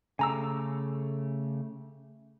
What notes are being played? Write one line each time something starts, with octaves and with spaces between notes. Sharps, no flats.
C#3 A3 G4 G#5 A#5 E6